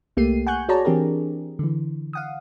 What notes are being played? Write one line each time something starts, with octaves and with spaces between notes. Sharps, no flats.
C2 A3 A#3 G4 C7 D#7
F#5 G#5 C#6 F#6 G6
F#4 G#4 C#5 D5 A5 A#5
E3 C4 D4 G4 G#4 A#4
D3 E3
F5 F#5 D#6